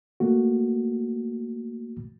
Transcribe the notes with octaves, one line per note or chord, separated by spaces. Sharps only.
A3 A#3 F#4